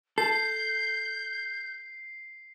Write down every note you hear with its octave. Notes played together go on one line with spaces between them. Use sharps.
A4 G6 C7